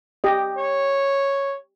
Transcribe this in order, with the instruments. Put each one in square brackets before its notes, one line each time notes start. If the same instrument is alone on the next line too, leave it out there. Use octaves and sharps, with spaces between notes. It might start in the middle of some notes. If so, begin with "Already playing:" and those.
[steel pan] G4 D#5
[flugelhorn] C#5